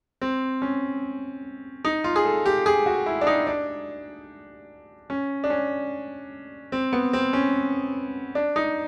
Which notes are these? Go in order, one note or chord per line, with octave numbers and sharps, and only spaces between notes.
C4
C#4
D#4
F4
G#4
A4
G4
G#4
F#4
E4
D4
D#4
D4
C#4
D4
C#4
C4
B3
C4
C#4
D4
D#4